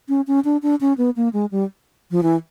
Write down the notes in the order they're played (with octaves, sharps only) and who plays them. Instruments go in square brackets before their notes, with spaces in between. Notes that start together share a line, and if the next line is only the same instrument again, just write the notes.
[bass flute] C#4
C#4
D4
D4
C#4
B3
A#3
G#3
G3
F3
E3